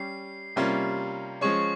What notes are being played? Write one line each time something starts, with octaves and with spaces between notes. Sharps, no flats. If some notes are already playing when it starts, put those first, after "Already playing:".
Already playing: G3 C#4 G4 C7
C3 G3 A#3 C#4 F4
F3 G#3 C#4 G#4 C#5 C#6